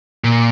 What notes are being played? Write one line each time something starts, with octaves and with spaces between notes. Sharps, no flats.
A#2